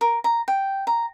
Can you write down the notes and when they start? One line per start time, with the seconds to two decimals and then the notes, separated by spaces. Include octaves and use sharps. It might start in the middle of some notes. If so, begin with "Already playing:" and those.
0.01 A#4
0.24 A#5
0.48 G5
0.87 A#5